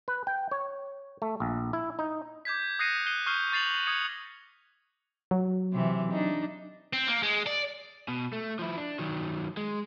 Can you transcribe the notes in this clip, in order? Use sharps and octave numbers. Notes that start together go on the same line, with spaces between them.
B4
G5
C#5
A3
A#1
E4
D#4
D6 G6 G#6 B6
D#6 F#6 A#6 C7 C#7 D#7
F#6 C7 D#7 G7
C#6 D#6 F6 G6 C7 G7
C#6 A6 C7 F7 F#7
D#6 G#6 C#7
F#3
C3 E3
D4 D#4
C4
A#3
G#3
D5
B2
A3
F3 E4
D4
D#3 F#3
G#3